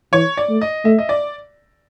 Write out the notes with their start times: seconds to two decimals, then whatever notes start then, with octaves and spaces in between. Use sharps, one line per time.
0.13 E3 C#5
0.37 D5
0.49 A3
0.61 D#5
0.85 A3 E5
0.99 D#5
1.09 D5